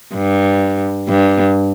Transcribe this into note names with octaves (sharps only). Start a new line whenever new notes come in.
G2
G2